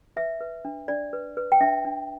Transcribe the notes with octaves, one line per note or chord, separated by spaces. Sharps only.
B4 E5
B4
D4
D4 D5
B4
B4
G5
D4 E5
D4